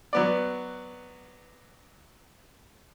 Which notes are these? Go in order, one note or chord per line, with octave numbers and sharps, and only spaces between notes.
F#3 B3 D5